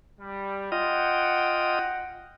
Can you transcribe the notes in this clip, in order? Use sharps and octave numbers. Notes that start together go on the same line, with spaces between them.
G3
F4 D#5 F#5 G5